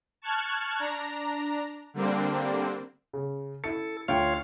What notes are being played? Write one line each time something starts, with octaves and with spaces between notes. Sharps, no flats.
A5 C#6 F6 F#6 G#6
D4 A#5
D3 G3 A#3 C4 D4
C#3
E4 A4 C#7
D2 F4 C#5 F5 G5